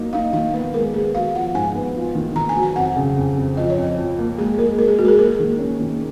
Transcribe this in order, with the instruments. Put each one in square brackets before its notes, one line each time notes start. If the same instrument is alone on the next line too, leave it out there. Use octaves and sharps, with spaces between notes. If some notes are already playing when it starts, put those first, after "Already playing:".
Already playing: [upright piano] F#3 A#3 D#4
[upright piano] D#4 [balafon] F5
[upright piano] D#3 [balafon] F5
[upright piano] B3 [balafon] B4
[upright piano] G#3 [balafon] A#4
[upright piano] B3 [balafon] G#4
[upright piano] F#4 [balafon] F5
[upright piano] F3 [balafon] F#5
[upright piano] G#2 [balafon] G#5
[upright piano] B3
F4
D#3
[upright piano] D#3 [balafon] A#5
[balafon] G#5
[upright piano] F#3
[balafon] G#5
[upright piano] F2 [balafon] F#5
[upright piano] C#3
F2
F2
[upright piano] F3 [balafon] D#5
[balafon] C#5
[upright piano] F2 [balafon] D#5
[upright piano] F3
A#3
[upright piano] G#3 [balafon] G#4
[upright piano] G#3 [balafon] A#4
[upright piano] G#3 [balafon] A#4
[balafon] G#4
[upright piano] G#3 [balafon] F#4
[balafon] A#4
G#4
[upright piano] A#3 [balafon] A#4
[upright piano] D#3
C#4
D#3